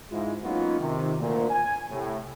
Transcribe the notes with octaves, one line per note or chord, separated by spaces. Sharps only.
G#2 G#3 E4 F4
F#3 A#3 B3 C#4 D#4 F4
C3 D#3
D2 A#2
G#5
A2 C3